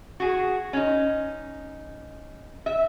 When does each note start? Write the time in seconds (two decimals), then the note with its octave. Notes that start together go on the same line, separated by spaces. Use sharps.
0.20 F#4 G#4
0.73 C#4 D#4
2.66 E5